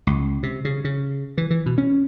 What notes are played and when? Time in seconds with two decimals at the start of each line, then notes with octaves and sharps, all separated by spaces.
0.07 C#2
0.43 C3
0.65 C#3
0.84 C#3
1.38 E3
1.50 E3
1.66 B2
1.78 C#4